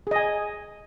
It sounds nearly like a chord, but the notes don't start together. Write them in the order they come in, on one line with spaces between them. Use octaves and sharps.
G#4 D#5 G#5